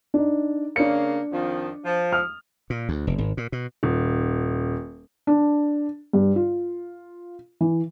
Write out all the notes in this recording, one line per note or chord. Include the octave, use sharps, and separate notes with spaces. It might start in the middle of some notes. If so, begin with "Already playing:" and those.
D4 D#4
C#3 A#3 D4 C#7
F2 D#3 F3
F3
D#6 F6
A#2
D2
F1
G#1
A#2
B2
D#1
D4
G2
F4
E3